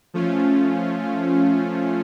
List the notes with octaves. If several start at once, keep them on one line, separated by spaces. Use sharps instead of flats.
F3 A3 C#4 F4